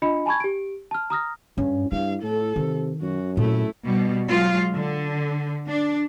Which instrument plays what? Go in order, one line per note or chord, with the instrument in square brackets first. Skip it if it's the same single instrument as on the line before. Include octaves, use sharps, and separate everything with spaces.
[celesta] D4 F4 D#5 B5 C#7
G#5 A5 B5 C#6 G#6
G4 D7
A5 F6
A#5 D#6 F6 A#6
[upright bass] G2 [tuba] C#4
[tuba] G2 [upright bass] E4 [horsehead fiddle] F5
[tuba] A2 [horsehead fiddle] A4
[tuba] C3 [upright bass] D#3
[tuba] F#2 [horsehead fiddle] F#4
[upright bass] A#2 [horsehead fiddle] A3 E4
[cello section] B2 G3
F#3 G#3 F4
D3
D4